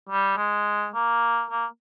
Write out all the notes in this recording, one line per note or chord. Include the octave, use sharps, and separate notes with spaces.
G3
G#3
A#3
A#3